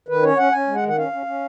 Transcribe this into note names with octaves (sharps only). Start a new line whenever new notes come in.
D#3 B4
C#4 C#5
C#4 F#5
C#4 G#5
G#3
F#5
D#3
F#5
C#4 F5
C#4
C#4